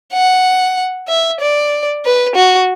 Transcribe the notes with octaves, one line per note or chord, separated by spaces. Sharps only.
F#5
E5
D5
B4
F#4